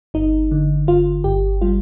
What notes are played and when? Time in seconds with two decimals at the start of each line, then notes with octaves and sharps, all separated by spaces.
0.14 G1 D#4
0.51 D3
0.87 G1 F4
1.24 G1 G4
1.61 G3 F4